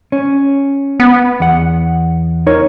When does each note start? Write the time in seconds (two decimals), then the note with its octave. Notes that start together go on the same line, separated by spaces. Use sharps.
0.12 C#4
1.00 B3
1.40 E2 F#5
2.47 D#4 A#4 C#5